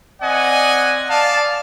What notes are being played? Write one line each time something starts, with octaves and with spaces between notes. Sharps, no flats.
C4 D5 D#5 F#5 G#5
D5 F5 A5